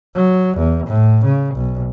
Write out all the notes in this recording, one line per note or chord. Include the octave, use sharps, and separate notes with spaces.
F#3
E2
A2
C#3
B1